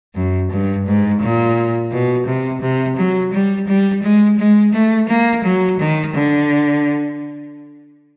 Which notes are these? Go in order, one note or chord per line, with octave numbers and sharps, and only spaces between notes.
F#2
G2
G#2
A#2
B2
C3
C3
F#3
G3
G3
G#3
G#3
A3
A#3
F#3
D#3
D3